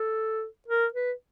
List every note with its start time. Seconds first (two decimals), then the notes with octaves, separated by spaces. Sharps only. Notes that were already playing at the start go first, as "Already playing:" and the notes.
Already playing: A4
0.68 A#4
0.94 B4